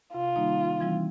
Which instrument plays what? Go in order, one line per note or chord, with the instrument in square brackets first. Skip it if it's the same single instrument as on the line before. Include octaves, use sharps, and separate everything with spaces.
[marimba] C3 [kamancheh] F4
[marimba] D#3 G3 A#3 D#4
C3
E3 G3 C4 E4